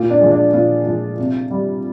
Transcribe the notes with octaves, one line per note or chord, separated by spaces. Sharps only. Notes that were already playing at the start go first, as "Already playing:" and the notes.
Already playing: A#2 F4
D4
F3 G#3
D4
A#2 F4
F3 G#3
C3
G3